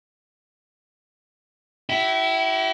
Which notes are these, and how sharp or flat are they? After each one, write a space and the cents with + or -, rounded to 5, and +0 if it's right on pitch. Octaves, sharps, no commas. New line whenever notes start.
E4 +0 G4 -45